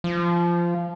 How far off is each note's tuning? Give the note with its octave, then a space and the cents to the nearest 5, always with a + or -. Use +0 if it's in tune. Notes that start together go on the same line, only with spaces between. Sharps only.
F3 -15